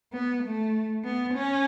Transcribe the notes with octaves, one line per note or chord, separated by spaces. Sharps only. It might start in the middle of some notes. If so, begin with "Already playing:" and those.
B3
A3
B3
C#4